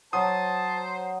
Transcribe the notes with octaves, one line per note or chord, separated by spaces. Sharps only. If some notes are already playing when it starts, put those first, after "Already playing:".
F#3 C5 A5 D#6